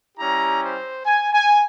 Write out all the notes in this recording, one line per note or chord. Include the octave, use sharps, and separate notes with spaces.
G3 C#4 E4 G4 A#5
C5
G#5
G#5